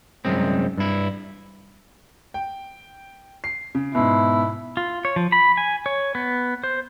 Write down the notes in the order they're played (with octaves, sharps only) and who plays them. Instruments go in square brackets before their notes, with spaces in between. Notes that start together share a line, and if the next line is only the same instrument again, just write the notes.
[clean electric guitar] C2 F#2 G#3 C4
G2 E4
[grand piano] G5
C7
C#3
[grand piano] G#2 B2 [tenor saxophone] E4
[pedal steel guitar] F4
C#5
F3
B5
G#5
C#5
B3
C5